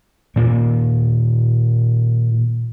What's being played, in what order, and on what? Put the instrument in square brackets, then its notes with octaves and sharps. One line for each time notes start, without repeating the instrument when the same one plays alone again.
[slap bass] A#2 D#3 A#3